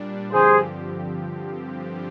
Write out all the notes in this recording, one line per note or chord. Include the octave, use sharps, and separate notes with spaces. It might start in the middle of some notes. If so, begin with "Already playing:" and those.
Already playing: A#2 G3 D4
G2 D3 F3 C4 G4 G#4 C5